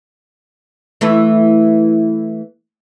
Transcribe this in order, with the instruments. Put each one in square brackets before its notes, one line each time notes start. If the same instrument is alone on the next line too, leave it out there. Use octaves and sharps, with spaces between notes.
[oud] E3 A3 E4